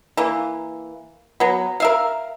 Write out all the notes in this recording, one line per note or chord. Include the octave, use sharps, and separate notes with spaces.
E3 A#3
F#3 B3
A#4 E5 F5